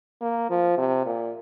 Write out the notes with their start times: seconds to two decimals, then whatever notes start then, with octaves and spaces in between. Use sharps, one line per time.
0.22 A#3
0.50 F3
0.78 C3
1.06 A#2